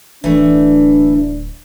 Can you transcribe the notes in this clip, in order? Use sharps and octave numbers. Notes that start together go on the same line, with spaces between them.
D1 E3 A3 D4